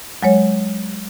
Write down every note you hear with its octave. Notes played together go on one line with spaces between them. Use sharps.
F#3 G#3 C#5